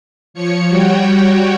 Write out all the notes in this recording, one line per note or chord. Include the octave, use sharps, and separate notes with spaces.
F3 C#5 C#7
G3 F#4 C#5 G5